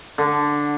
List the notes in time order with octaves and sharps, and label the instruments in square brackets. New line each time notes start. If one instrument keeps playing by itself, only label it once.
[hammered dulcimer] D3